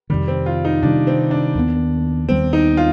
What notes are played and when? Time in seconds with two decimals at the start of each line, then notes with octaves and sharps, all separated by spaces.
0.10 F2 C3 D#3 G3
0.28 C4
0.46 F4
0.65 D#4
0.83 C3 D#3 G3 D4
1.07 C4
1.31 D4
1.55 D#2 D#3 B3
2.29 D#2 D#3 G3 B3 C4
2.53 D#4
2.77 F4